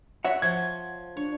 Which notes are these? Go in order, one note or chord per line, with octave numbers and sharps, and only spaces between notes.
F#4 C#5 E5 F#5
F3 G#6
D4 C#5